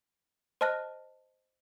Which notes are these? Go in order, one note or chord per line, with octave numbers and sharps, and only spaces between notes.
C5 D#5 A5 F6 F#6 A#6